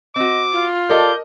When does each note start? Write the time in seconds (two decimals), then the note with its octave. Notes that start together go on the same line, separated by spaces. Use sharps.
0.16 C4 F#4 D#5 D6
0.53 F4
0.89 G4 A4 A#4 D5 D#5 G6